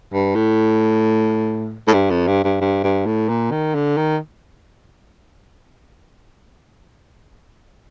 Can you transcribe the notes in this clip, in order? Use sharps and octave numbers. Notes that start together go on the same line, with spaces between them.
G2
A2
A2
G2
F2
G2
G2
G2
G2
A2
A#2
D#3
D3
D#3